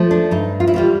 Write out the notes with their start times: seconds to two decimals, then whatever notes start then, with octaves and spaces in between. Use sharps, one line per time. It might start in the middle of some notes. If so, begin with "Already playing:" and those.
Already playing: F3 A3
0.11 D4
0.31 G2 D#4
0.60 F4
0.67 E4
0.74 E3 G3 F4